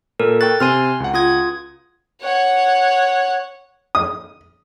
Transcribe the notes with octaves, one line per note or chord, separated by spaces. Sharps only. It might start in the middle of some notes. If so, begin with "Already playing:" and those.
A#2 A4 A#4
G5 C#6 F#6 A6
C3 C4 G#5 C6 F6
C#2 F#5
F4 D#6 G#6
C#5 F#5
D#6